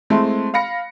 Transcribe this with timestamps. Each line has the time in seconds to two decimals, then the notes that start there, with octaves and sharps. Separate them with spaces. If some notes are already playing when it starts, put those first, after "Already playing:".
0.10 G#3 A3 C4 E4
0.54 F5 B5 A#6 C#7